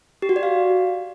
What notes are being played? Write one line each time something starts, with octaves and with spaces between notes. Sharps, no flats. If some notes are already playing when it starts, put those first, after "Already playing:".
G4
F#4
D5
F5